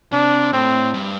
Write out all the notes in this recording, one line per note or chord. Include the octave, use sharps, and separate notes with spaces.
C3 D4
A2 C4
G2